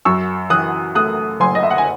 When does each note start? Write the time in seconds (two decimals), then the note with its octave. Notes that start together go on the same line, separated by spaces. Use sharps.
0.05 F#2 C#6 E6
0.50 E3 D#6 F#6
0.95 A3 D#6 F#6
1.40 F#1 G#5 C6
1.55 D#5
1.63 E5
1.70 F#5
1.78 G#5